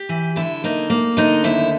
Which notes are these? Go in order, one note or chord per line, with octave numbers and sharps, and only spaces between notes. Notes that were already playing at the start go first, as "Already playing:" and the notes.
Already playing: G4
E3
D3 E4
A#3 D#4
A#3
D3 D#4
D#2 E4